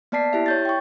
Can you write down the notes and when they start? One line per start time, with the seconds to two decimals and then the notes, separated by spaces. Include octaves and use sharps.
0.12 A#3 B3 D5 A5 B6 C7
0.33 E4 G4 E5
0.46 C#5 G6 A6
0.65 G5 C#6